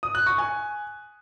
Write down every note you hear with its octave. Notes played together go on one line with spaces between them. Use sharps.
D#6
F#6
C#6
G#5